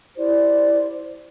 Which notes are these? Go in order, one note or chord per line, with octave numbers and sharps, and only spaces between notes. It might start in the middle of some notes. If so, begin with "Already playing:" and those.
E4 G4 C5 D5